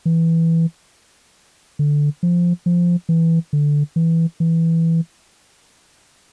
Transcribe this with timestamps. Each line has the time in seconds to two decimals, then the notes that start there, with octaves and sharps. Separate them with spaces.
0.06 E3
1.79 D3
2.23 F3
2.66 F3
3.09 E3
3.53 D3
3.96 E3
4.40 E3